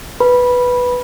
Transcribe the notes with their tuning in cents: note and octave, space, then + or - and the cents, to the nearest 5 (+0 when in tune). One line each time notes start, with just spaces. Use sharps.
B4 +0 B5 -15